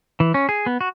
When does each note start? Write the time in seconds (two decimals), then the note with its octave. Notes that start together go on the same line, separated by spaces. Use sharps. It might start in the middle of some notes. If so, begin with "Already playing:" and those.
0.20 E3
0.34 C#4
0.49 G#4
0.66 B3
0.81 F#4